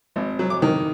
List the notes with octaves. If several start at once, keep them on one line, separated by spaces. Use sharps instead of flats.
G#1
F#3
D6
D#3